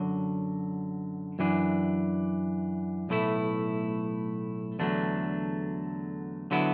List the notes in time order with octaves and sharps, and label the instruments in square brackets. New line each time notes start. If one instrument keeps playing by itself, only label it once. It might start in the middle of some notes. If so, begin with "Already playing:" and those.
Already playing: [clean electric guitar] F#2 D3 F#3
F#2 E3 D4
B1 A2 A3 E4
E2 D3 F#3 A3 D4
D3 F#3 B3 E4